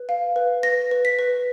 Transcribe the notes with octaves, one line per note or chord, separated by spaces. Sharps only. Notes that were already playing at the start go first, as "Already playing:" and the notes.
Already playing: B4
F5
B4
B4 A#6
B4
B6
B4